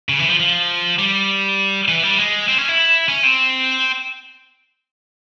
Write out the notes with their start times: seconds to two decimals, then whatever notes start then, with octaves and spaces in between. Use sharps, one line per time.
0.09 C#3
0.19 E3
0.29 F3
0.40 F3
0.99 G3
1.88 E3
2.03 G3
2.18 G#3
2.48 C4
2.58 C#4
2.68 E4
3.08 C#4
3.23 C4